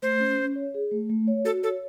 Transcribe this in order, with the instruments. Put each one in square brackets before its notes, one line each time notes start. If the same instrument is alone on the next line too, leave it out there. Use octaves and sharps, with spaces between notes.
[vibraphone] A3 [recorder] C5
[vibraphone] C#4
C#4
C#5
G#4
A3
A3
C#5
[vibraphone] F#4 [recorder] A4
[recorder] A4 [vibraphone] C#5